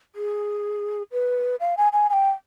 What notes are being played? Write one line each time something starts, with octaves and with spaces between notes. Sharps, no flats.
G#4
B4
F5
G#5
G#5
G#5
G5